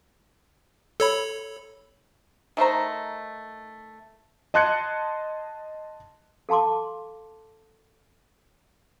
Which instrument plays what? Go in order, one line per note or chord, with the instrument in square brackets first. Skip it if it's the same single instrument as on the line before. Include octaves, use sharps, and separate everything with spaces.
[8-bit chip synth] A4 C#5 B5
[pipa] D#3 A3 C5 A#5
[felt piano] D#5 A5 C6 F#6 G#6 C#7
[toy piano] A4 F5 A5 C6 D6